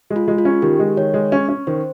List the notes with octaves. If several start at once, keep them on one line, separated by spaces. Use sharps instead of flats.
G#3
F4
G#3
F4
C#4
D#3 G4
G#3
D#3 C#5
G#3
C#4
C#4
D#3 C5